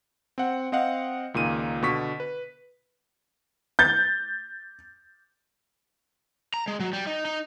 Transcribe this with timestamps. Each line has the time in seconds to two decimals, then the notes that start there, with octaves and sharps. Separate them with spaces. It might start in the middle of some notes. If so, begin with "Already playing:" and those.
0.38 C4 F#5
0.72 C4 D#5 F5 F#5
1.34 C#2 A#2 D#3 D#7
1.82 B2 D3 C#6 B6
2.20 B4
3.79 G6 A6
6.54 A#5
6.68 G#3
6.80 F#3
6.93 G3
7.07 D#4
7.25 D#4